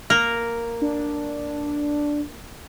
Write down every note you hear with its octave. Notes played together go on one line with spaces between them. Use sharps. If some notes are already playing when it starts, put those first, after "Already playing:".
A#3 A#4
D4